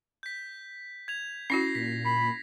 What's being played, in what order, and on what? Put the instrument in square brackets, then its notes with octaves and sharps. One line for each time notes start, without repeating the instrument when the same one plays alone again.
[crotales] G6 B6
G#6 F7
[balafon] C#4 E4 F#4 [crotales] A#6 C7
[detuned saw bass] A#2 [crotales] B6
[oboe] B5 [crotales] C7